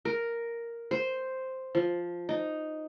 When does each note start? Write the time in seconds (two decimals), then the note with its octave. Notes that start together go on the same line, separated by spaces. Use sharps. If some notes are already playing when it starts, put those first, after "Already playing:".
0.05 A#4
0.91 C5
1.75 F3
2.29 D#4